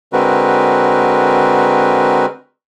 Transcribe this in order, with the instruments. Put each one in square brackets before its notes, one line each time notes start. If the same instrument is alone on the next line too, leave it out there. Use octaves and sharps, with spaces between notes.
[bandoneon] D3 G#3 C4 F#4 A#4 B4